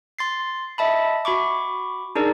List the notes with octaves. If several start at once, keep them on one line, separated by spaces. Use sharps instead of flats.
C6 A6 C7
D#5 E5 A5 B5
F#4 B5 C#6 D6
D4 D#4 G#4 A#4 D5